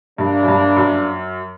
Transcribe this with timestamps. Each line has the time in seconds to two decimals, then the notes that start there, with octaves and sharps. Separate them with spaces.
0.18 G2 C3 F3 A#3 D4
0.43 F#2
0.48 G2
0.77 F#2